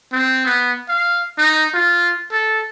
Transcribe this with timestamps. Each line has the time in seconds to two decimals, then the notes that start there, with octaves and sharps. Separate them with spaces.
0.12 C4
0.45 B3
0.89 F5
1.38 D#4
1.74 F4
2.31 A4